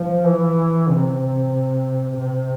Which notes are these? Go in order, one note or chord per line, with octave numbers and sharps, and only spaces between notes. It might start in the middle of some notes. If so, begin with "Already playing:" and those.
Already playing: F3
E3
C3
C3